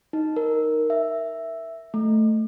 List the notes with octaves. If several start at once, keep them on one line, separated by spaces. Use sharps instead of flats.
D#4
A#4
E5
A3